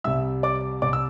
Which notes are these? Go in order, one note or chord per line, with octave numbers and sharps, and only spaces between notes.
C2 C3 G3 E5 E6
D5 D6
C2 C3 G3 D5 D6
E6